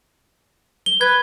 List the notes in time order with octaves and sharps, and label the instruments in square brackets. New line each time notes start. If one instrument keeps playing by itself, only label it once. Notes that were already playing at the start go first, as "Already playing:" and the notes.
[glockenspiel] G7
[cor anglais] B4 [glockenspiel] G#6